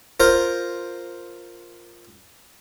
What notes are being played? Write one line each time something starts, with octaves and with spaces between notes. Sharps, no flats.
F4 A#4 C5